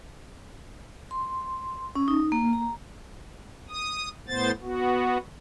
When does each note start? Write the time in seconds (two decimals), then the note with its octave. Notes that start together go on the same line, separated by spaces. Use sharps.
1.11 C6
1.95 C#4
2.08 D#4
2.32 A#3
2.53 A#5
3.69 D#6
4.28 A2 B3 C5 A6
4.62 B3 F#4